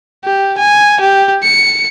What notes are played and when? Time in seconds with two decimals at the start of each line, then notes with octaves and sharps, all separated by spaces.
0.24 G4
0.57 G#5
1.00 G4
1.43 C#7